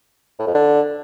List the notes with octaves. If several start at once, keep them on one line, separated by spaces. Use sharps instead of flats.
A2
F2
D3